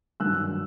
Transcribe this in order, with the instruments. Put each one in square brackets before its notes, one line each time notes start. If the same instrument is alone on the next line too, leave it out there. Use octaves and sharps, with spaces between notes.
[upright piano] G2 D#3 F#3 E6 F#6